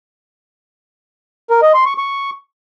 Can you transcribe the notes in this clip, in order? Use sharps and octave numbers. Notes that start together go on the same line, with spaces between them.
A#4
D#5
C6
C#6
C#6